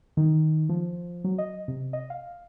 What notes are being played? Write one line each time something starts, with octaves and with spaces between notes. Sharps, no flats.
D#3
F3
F#3
D#5
C3
D#5
F5